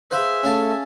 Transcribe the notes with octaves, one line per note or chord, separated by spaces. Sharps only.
G#4 B4 C5 E5 F5
A3 C#4 F5 A5